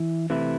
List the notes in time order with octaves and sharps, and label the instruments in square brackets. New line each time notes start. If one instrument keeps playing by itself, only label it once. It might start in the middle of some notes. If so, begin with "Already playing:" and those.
Already playing: [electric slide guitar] E3 E4
C3 E3 A3 E4